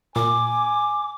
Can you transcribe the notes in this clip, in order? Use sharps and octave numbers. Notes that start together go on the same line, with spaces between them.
A#2 G#5 D6